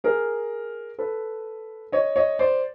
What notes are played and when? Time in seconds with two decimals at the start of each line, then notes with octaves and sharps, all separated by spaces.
0.04 G#4 A#4
0.98 A4 B4
1.92 C#5 D#5
2.16 C#5 D#5
2.39 C5 D5